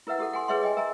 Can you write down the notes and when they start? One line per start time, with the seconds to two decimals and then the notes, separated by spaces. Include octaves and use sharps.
0.07 E4 A#4 B4 E5 F#5
0.19 E4 G4 A4 F#5
0.33 F#5 G#5 C6
0.48 G#4 B4 C#5 E5 F#5 C6
0.63 D#5 G5 G#5
0.77 A#4 E5 G#5 A#5